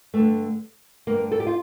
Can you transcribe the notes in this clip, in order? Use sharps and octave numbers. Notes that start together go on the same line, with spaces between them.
G2 D3 A3
G2 D3 A#3
A4
G4
F4